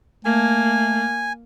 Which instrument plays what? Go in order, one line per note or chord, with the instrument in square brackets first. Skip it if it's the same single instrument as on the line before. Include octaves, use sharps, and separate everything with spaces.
[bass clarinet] A3 [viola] A#3 [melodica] G#5